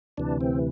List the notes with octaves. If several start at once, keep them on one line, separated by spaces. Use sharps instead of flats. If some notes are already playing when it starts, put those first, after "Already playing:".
D2 C3 E3 D4
C4